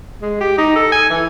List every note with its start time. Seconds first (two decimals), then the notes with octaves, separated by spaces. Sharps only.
0.22 G#3
0.41 G4
0.58 D#4
0.76 A4
0.92 G#5
1.10 E3